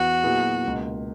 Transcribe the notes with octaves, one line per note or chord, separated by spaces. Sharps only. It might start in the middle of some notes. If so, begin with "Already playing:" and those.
Already playing: E2 B3 F#4
A#2 F#3 B3 E4 G#4
C#2 B2 A#3